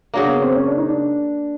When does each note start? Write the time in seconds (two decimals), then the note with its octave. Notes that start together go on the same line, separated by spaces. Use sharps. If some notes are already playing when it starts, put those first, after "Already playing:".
0.14 C#3 F#3 A#3 D4
0.27 B3
0.42 C4
0.56 C#4
0.67 D4
0.77 D#4
0.89 D4